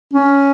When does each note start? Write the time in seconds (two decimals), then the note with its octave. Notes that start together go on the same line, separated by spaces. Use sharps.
0.14 C#4